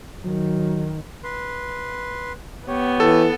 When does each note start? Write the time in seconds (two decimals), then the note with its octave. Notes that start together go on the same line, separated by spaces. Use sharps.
0.25 D#3 F#3
1.24 B4 C6
2.68 B3 G4 C#5
3.00 E3 A4